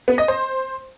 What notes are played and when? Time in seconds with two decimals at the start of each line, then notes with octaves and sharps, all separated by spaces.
0.08 B3
0.18 D#5
0.28 C5